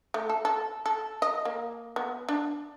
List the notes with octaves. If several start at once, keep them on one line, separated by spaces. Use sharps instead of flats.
A3
A4
A4
A4
D#5
A#3
B3
D4